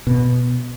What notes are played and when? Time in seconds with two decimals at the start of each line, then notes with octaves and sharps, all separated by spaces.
0.07 B2